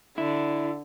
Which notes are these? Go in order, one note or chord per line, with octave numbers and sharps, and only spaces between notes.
D3 E4